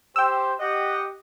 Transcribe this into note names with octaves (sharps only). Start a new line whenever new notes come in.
G4 C5 G5 E6
G4 D#5 F#5